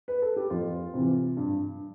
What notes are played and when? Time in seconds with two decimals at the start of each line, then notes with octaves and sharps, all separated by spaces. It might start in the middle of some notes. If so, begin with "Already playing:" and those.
0.08 B4
0.22 A4
0.36 G4
0.50 F2 F4
0.94 C3 E3
1.37 G2